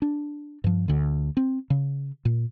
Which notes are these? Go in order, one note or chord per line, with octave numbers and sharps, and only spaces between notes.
D4
G2 F3
D2 D3
C4
C#3
A#2